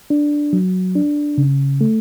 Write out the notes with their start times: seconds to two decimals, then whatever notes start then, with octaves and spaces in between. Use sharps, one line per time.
0.10 D4
0.53 F#3
0.95 D4
1.38 C#3
1.81 A3